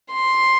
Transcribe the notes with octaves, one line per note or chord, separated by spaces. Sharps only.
C6